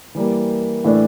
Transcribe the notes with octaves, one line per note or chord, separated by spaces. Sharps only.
E3 G3 A#3
A2 E3 A3 D4